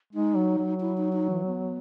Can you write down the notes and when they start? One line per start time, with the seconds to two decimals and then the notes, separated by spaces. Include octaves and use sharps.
0.13 G#3 D#4
0.35 F#3
0.58 F#3
0.80 E4
0.97 D#4
1.13 D#4
1.30 E3
1.46 B3